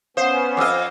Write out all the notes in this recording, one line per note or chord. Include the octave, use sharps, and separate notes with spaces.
B3 C#4 C5 F5 F#5 D#6 C7
F2 D#5 D6 E6 F6